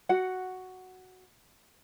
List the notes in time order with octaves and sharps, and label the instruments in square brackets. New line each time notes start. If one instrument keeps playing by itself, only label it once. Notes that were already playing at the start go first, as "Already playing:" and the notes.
[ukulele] F#4 F#5